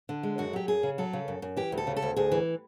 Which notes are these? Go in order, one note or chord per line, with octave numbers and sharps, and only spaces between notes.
D3
G#3
F#2 F#4
F#3 G4
F#2 G#4
C#3
F#3 A4
C#3
F#2
F#2
E3 G4
D2
A4
C#3
A4
D2
D2 G#4
E3